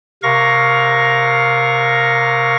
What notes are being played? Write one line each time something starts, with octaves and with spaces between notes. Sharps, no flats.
C3 A#4 F5 C#6 A#6